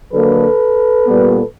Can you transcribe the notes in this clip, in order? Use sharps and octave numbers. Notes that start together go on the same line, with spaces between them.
D3 F#3 A#3 A4 B4
A#2 G3 B3